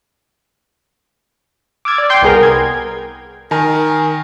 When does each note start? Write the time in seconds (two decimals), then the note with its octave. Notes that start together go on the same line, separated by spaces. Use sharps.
1.85 D6 E6 F6 G#6 A6
1.98 D5
2.10 G5 C6 C7
2.22 C2 B3 G#4 A#4
2.43 G#6
3.51 D#3 A#4 G#5